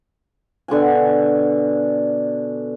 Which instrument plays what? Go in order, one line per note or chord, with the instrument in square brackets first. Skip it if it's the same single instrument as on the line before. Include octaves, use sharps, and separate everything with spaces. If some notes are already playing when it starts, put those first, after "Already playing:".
[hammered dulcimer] B2 D3 F#5 G#5